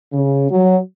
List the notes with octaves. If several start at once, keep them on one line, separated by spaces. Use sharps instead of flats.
C#3
F#3